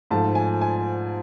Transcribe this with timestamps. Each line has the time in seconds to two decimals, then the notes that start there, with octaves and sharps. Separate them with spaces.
0.11 G#2 F3 A3 A5
0.35 G#5
0.61 G#5